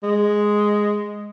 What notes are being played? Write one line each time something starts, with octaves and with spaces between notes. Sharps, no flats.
G#3